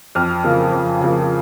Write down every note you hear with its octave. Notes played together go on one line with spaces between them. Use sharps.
F2 F6
C#3 F3 A#3
F2
C#3 F3 A#3